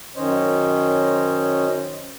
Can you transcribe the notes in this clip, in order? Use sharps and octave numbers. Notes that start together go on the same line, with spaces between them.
F#2 D#3 C#4 C5 C#5 D#5